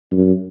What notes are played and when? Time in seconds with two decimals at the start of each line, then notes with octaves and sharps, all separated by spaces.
0.12 F#2